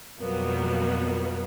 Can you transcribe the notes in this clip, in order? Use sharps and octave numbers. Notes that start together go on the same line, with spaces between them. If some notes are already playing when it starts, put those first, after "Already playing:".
F2 B2 F#3 G3 A#3 B3